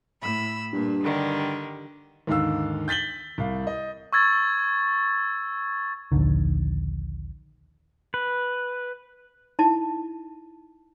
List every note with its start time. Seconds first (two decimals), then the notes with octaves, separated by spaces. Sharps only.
0.21 A2 B5 E6
0.73 G2 A#2
1.03 D3 D#3 G3
2.27 D#2 G#2 D3 F5 E6
2.88 G6 A6 B6 F#7 G7
3.38 C2 F5
3.67 D#5
4.13 C#6 E6 G#6 A6
6.12 A#1 D#2 D3 D#3
8.14 B4
9.59 D#4 E4 A5